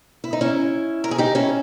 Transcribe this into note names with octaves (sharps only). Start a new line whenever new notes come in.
E4
D#4
C#4 E4
A#4
G#4
D#4 G4
C#4 E4